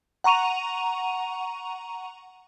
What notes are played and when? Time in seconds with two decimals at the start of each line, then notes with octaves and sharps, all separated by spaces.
0.24 F#5 A#5 C#6 D#7 F7